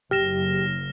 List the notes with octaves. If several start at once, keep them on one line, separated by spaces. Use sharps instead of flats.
F#1 G4 F6 A#6 E7